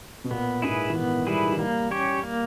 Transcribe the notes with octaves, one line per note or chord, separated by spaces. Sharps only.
B2
A#2 B3
G#2 E4 G#4 B4
E3
D#3 B3
G3 E4 G#4 B4
D#3
E3
G3 A#3
C#4 G4 C#5
A#3